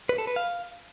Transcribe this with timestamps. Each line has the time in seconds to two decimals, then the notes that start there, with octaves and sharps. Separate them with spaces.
0.09 B4
0.18 A4
0.27 B4
0.36 F5